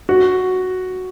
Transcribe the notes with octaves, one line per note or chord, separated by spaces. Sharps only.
F#4